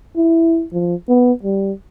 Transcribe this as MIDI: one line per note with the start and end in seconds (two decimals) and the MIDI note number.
0.16 0.64 64
0.73 0.95 53
1.09 1.32 59
1.43 1.72 55